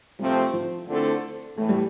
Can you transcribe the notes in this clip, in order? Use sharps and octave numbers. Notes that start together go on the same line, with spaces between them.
C3 F3 G3 A3 C4
F3
D3 A3 C4 E4 A4
A2 E3 A3
G3